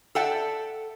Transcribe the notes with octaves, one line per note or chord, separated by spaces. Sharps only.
A4 D5 E5 F#5 G5 A5